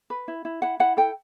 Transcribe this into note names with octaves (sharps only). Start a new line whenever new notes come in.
B4
E4
E4
E4 F#5
E4 F#5
A4 G5